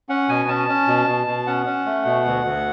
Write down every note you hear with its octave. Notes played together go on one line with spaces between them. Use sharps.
C#4 F#5
B2 G#5
C#4 A5
C#4
B2
B2
B2
C#4 F#5
C#4
A3
B2
D2
D2